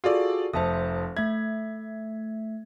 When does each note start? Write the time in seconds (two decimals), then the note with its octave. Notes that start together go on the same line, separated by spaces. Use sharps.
0.04 F4 F#4 G#4 A4 D5
0.54 F1 C5 E5 A5 D#6
1.17 A3 E5 G#6